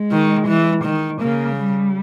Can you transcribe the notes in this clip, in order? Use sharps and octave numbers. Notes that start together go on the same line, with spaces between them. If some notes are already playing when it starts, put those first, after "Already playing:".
Already playing: G#3
D#3
E3
D#3
C#3 A#3
G3